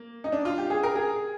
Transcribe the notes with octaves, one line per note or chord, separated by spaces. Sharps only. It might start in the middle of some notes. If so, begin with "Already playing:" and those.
Already playing: A#3
D#4
D4
F4
G4
G#4
A#4
G#4